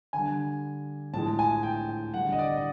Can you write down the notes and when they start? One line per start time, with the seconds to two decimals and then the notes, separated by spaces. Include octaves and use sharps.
0.13 D3 G3 G#5
1.13 A2 F3 G#3 A5
1.39 G#5
1.63 G5
1.89 G5
2.13 D3 G3 F#5
2.32 D#5
2.39 D5
2.57 D#5